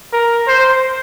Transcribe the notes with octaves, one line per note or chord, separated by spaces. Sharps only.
A#4
C5